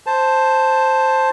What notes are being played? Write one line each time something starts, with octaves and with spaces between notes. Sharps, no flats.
C5 A5